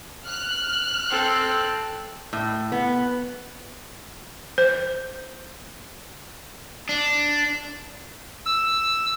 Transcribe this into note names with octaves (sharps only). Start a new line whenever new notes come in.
F6 F#6
C4 A4
A2
B3
C5
D4
E6